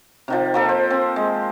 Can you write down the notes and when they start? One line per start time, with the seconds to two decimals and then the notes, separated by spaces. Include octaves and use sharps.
0.28 C3 D#3 F3
0.54 F3 A#3 A4
0.69 C5
0.90 C4
1.16 G#3